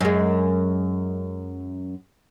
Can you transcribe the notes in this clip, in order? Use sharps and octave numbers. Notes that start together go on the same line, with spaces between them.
F#2 G#3